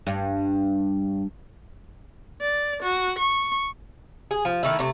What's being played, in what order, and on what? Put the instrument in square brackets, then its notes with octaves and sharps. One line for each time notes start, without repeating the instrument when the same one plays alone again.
[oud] G2
[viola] D5
F#4
C#6
[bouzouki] G#4
F3
D#3 A3 E4
C3 A3